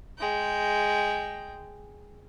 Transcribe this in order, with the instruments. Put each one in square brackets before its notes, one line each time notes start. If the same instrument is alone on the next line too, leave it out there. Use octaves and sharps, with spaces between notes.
[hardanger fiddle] G#3 G5